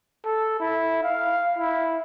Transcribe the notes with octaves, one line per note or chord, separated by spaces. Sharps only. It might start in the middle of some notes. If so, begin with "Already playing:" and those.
A4
E4
F5
E4